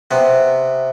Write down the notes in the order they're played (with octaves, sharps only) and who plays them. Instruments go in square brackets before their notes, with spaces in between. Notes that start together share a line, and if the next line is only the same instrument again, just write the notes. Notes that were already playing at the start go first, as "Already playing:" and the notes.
[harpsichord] C3 B3